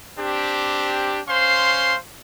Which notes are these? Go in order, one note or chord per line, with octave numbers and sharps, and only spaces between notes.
C4 D4 G4
C#4 C5 F5 C6